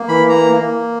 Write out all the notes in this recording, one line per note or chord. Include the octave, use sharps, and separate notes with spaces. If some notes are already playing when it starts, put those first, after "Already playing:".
Already playing: A#3
E3 B5
A#3 A#5
A#3